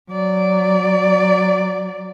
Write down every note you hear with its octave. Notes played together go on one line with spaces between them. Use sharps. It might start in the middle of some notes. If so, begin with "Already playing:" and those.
F#3 D5